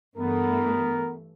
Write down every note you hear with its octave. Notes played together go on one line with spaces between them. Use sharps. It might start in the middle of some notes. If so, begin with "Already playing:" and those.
G2 E3 A3 B3 A#4